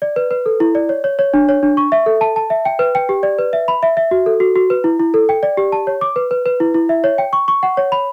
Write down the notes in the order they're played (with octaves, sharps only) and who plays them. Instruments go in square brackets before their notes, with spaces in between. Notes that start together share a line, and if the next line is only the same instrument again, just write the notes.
[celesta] D5
B4
B4
A4
E4
D5
C#5
C#5
C#5
D4
C#5
D4
C#6
E5
A4
A5
A5
E5
G5
B4
G5
G4
D5
B4
E5
B5
E5
E5
F#4
A4
F#4
F#4
B4
E4
E4
A4
G5
D5
G4
A5
C#5
D6
B4
B4
B4
E4
E4
E5
C#5
G5
C#6
C#6
F#5
C#5
B5